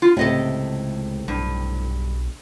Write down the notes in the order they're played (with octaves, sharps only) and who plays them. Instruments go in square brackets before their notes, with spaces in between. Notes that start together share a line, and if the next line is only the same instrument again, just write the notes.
[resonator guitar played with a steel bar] F4
[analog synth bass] C#2 [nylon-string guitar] A2 C3 [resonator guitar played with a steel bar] A4 D#5 E5
[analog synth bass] B1 [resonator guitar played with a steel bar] G2